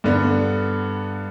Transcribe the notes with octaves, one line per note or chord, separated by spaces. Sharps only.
G2 D3 B3